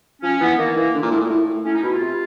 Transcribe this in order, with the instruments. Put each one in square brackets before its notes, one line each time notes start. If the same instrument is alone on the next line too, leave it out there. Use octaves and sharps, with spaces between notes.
[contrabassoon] F3 [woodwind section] C#4
[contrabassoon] E3 [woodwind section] B3
[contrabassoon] D#3 [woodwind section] A#3
[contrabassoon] E3 [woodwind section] A#3
[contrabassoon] D3
A#2
A2
A#2
A2
A2
[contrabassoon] A2 [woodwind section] C#4
[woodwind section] D#4
[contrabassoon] B2 [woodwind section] E4
[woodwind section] F4
[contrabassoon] C3